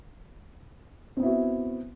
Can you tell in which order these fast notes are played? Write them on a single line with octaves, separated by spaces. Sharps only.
C4 B3 E4 F#4